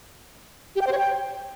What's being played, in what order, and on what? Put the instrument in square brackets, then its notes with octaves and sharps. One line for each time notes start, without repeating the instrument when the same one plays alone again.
[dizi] G4
G5
C5
C#5
G5